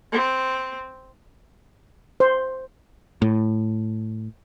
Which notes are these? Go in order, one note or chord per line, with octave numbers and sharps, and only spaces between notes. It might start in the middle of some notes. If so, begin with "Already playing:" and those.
C4
C5
A2